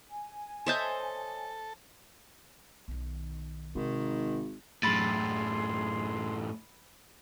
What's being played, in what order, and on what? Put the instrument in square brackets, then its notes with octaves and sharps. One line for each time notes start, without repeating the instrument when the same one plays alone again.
[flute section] G#5
[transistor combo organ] A4 [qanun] C5 E5 A5 [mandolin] C#5 D#5 G6
[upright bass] B1 D#3
[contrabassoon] G#1 [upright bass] C3 [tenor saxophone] D#3
[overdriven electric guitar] F#2 A2 [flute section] G#4 C6 [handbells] B5 A6